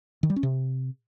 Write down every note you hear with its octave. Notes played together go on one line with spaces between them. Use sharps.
D#3
G3
C#4
C3